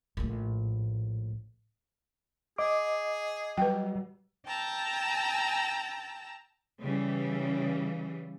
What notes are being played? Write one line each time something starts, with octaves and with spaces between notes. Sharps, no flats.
A#1 A2
G#4 D#5 D6
F#3 G3 B4 G5
G5 A5 A#5 E6
C#3 E3 G3